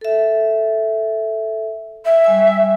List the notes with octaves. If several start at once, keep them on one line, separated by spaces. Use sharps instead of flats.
A4 E5
E5
G3 G#5 E6